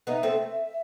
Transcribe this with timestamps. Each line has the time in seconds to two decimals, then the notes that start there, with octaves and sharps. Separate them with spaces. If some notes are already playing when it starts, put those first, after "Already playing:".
0.07 B3 D#4 E5
0.23 A3 C4